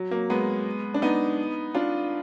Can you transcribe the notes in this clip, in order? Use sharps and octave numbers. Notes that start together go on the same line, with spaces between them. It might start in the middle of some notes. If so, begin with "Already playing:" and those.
Already playing: F#3
F#3 A#3
G#3 B3
D4
B3 D#4
D4 F4